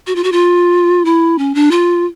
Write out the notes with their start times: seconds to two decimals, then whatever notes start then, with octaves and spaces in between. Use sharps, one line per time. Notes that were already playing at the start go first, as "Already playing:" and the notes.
0.07 F#4
0.16 F4
0.24 F#4
0.32 F4
1.05 E4
1.38 C#4
1.55 D4
1.71 F4